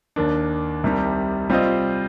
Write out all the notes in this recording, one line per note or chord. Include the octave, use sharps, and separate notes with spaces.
D#2 D#3 A#3 D4
C2 C3 D#3 G3
G3 C4 F4 C5 D#5